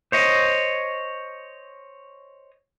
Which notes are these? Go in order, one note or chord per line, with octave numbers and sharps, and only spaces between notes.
C5 C#5 D#5